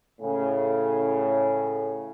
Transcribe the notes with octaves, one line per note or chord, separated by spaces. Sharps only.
A2 C#3